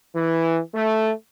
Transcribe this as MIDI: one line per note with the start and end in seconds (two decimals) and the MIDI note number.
0.15 0.59 52
0.75 1.12 57